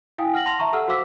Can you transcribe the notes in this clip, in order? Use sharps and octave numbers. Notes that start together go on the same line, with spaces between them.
E4 F5 G5 G#5 D#6
F#5 F6 A#6 F#7
A5 C6 A#6 F7
E5 A5 A#5 C#6
G4 A4 F#5 E6 F6
F#4 C5 F5 D6 E6 B6